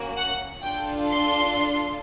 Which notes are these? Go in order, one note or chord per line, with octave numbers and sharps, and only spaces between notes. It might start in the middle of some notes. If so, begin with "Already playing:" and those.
Already playing: A#3 C#4 F#4
F#5
D4 F4 A4 G5
C6